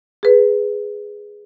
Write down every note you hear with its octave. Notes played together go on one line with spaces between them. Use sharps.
G#4 B4